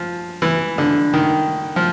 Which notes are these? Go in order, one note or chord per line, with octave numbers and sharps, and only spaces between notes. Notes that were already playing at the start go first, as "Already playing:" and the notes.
Already playing: F3
E3
D3
D#3
F3